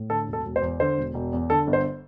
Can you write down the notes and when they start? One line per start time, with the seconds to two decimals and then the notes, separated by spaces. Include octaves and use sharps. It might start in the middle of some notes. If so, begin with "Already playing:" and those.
Already playing: A2
0.10 D3 A4
0.27 E1
0.33 A4
0.45 E1
0.56 C5
0.62 E2
0.80 D3 C5
0.98 E1
1.14 E1
1.33 E2
1.50 D3 A4
1.67 G1
1.73 C5